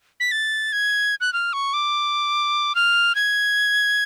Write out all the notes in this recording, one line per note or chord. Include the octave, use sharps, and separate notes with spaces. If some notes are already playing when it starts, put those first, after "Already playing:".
B6
A6
G#6
F#6
F6
C#6
D6
F6
G#6